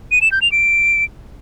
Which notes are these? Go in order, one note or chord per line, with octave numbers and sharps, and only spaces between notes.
D#7
E7
G6
F7
D7